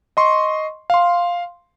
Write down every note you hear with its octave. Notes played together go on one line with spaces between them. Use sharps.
D#5 C6 C#6
F5 C6